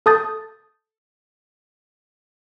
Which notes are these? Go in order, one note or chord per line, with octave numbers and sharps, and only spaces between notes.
A4 A5 D#6 G6 A6